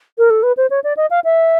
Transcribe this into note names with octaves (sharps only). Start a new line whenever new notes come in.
A#4
A4
B4
C5
C#5
D5
D#5
F5
E5